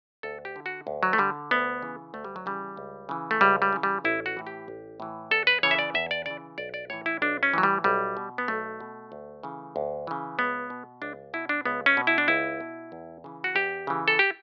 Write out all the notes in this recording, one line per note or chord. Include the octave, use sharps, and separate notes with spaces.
D2 A4
G4
D3
F#4
D2
F#3
A3
D3 G3
D2 B3
C#3 E3
D2 A3
G3
F#3
C#3 E3 G3
C#2
C#3 E3
A3
C#2 G3
G3
C#3 E3
G3
A1 E4
F#4
A2 E3
G4
A1
A2 E3
E2 A4
B4
C#3 E3 C#5
E5
D5
E2 E5
D5
C#3 E3 D5
B1 D5
D5
A2 E3 C#5
E4
B1 D4
C#4
A2 E3 F#3
G3
B1 G3
B2
B3
B1 A3
B2
D2
C#3 E3
D2
C#3 E3
C#2 B3
B2
C#2 D4
B2 E4
D4
C#2 B3
C#4
B2
E4
D4
C#2 E4
B2
E2
C#3 E3
F#4
E2 G4
C#3 E3
A4
G4